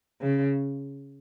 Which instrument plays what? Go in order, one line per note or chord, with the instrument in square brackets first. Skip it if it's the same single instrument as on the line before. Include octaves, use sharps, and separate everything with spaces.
[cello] C#3